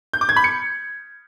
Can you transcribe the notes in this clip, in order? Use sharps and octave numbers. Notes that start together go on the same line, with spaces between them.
G6
D6
G#6
B5
C#7